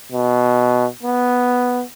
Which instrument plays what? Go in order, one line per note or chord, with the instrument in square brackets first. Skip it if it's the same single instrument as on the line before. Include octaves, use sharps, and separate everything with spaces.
[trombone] B2
B3